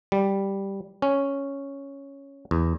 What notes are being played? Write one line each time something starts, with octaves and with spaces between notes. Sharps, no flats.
G3
C#4
E2